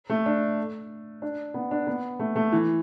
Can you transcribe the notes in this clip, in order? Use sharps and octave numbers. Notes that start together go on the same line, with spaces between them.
A3
D4
D4
B3
D4
B3
A3
A3
E3